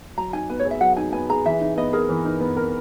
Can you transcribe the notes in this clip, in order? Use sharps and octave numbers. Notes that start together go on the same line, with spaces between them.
F#3 A#5
D#4 G#5
B3 B4
C#5
G#4
E5
F#3 F#5
D#4 G#5
B3 G#5
G#4 A#5
E3 E5
D#4
B3 D#5
G#4 A#4
E3
D#4
B3
A#4